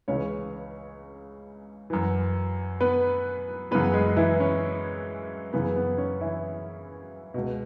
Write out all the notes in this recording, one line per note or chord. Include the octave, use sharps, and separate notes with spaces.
C#2 C#3 E3 C#4 C#5
F#2 E3
B3 B4
F#2 C#3 E3 B3 B4
G#3 G#4
E3 E4
C#4
F#2 C#3 E3 B3
B3
C#4
E3 E4
C#2 B2